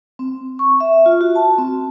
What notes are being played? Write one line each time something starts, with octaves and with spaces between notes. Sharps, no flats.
C4
C#6
E5
F4
F#4
A5
C4